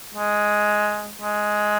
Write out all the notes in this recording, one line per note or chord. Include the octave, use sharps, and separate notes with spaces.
G#3
G#3